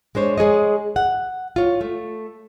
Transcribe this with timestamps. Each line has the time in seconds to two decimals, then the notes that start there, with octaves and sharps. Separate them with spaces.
0.15 G#3 D4 C5 C#5
0.38 G#3 G#4 C#5 D#5
0.96 F#5
1.56 F4 C#5
1.81 A3